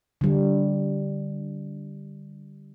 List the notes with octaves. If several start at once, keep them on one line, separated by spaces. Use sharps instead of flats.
D3 G3